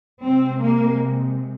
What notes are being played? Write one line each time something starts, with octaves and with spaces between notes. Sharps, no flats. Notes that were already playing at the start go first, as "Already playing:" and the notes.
C3 G#3 C4
A#3